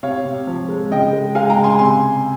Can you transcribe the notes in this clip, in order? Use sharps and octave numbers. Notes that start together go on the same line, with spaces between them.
C3 C#5 F5
C3
F3
G#3
C#3 D#5 G5
G#3
G#3 F5 G#5
G5 A#5
C#3
G#5 C6
C3 G#5 C6